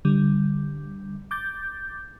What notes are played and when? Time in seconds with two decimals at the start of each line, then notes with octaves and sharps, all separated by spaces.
0.05 D3 G3
1.31 D6 G6 A6